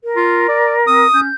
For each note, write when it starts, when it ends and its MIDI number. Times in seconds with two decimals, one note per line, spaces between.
0.04 1.07 70
0.16 0.44 65
0.48 0.76 74
0.87 1.06 60
0.87 1.20 87
1.13 1.30 61
1.13 1.35 91